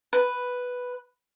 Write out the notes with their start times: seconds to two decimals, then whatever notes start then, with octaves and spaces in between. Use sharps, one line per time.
0.13 B4